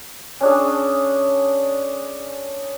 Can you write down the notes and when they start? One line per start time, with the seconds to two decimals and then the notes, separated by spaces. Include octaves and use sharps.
0.41 C#4 D4 G#4